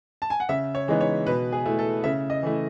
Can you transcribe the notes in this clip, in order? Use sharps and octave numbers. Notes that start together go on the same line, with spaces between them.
A5
G#5
F#5
C#3 E5
C#5
E3 G#3 B3 D#4
C#5
B2 B4
G#4
A3 E4
A4
C#3 E5
D#5
E3 A3 E4